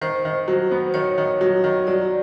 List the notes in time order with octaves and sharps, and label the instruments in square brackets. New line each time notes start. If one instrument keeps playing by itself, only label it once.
[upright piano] D#3 [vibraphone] C5
[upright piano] D#3
F#3
B3
[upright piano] D#3 [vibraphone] C#5
[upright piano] D#3
F#3
D#3
[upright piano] F#3 [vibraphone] D5